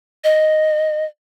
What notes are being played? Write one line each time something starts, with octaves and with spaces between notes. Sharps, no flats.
D#5